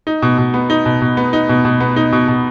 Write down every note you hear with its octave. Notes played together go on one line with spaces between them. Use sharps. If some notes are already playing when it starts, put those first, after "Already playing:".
D#4
B2
B2
B3
D#4
B2
B2
B3
D#4
B2
B2
B3
D#4
B2
B2